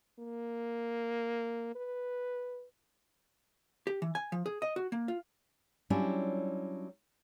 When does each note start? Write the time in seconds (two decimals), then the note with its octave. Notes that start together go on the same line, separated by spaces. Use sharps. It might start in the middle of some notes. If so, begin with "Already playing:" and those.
0.19 A#3
1.75 B4
3.87 G4
4.02 E3
4.15 G#5
4.32 F3
4.46 G#4
4.62 D#5
4.76 F#4
4.92 A#3
5.08 F4
5.90 F#3 G3 C#4 D4 E4 F4